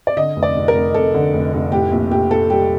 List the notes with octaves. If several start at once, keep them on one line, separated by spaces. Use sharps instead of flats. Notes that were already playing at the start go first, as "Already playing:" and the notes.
D5
D3 D#5
F1
D5
F1
A#4
F1
F1 A4
D3
F1
F1
A2 G4
A#1
A#1 G4
A#1 A4
G3 G4